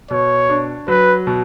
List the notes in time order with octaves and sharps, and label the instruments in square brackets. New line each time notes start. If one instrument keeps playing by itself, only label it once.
[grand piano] B2 [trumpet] C#5
[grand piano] D4
[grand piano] F#3 [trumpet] B4
[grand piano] B2